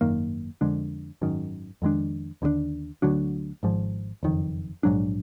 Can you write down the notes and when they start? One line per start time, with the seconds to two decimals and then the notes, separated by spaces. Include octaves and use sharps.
0.01 G#1 F#2 D#3 A#3
0.61 F2 D3 G#3 D4
1.22 G#1 F#2 D#3
1.82 F2 D#3 G#3 D4
2.42 D#2 D3 F#3 D4
3.02 D2 D3 F#3 D4
3.63 G#1 G#2 F3
4.23 F#1 F2 D#3
4.83 A#1 G#2 F#3 D4